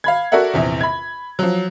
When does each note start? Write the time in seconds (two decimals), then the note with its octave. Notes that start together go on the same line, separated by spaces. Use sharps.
0.04 F5 B5 G#6
0.32 F#4 A4 A#4 D5 E5 F#5
0.54 A#1 E2 C3
0.81 B5 G#6
1.39 F3 F#3